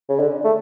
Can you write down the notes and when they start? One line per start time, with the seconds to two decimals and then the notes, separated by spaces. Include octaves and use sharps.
0.09 C#3
0.19 D3
0.44 A3